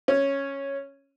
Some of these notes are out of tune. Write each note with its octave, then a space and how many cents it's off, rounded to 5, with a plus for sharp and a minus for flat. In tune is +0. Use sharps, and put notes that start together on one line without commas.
C#4 -5